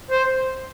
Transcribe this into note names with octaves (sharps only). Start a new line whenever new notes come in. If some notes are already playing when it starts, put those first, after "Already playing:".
C5